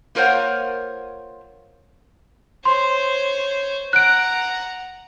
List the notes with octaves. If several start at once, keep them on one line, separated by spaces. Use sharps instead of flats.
A#3 F4 A#4 C5 C#5 F#5
C5 C#5 C6
F#5 A#5 F#6 D7